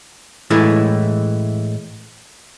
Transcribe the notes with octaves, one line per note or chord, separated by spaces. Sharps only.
A2 E3 G#3 A3 E4